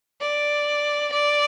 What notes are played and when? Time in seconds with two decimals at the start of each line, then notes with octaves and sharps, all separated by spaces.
0.21 D5
1.12 D5